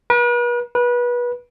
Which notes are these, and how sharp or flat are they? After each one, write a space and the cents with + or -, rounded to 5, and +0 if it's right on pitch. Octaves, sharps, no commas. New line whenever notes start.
B4 -40
B4 -25